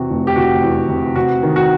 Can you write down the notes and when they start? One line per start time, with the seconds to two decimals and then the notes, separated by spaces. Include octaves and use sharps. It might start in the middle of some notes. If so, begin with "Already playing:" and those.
Already playing: E2 C3 F#4
0.10 F1
0.27 G4
0.36 F1 F#4
0.62 E2
0.89 C3
1.16 C3 F#4
1.43 D#3
1.56 F#4